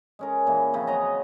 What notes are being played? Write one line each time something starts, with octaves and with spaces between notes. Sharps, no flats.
G#3 C#4 A#4
A#2 E3
C#3 F3 C4
F#3 F#4 D#5 A#5